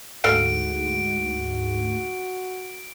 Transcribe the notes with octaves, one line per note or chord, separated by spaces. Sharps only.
D2 G#2 F#4 A4 F5 F#5 D7